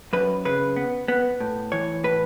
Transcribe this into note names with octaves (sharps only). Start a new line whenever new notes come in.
F#2 B4
C#3 B4
B3
B3
A2
E3 C#5
A2 B4